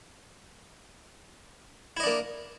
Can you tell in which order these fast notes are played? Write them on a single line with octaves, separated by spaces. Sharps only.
E4 D#5 D4 A#3